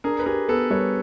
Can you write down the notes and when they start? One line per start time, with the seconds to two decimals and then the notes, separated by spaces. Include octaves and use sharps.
0.04 D4 G#4 A#4
0.19 B4
0.26 G4 G#4 A#4
0.49 B3 A4 B4
0.70 G3 B4 C#5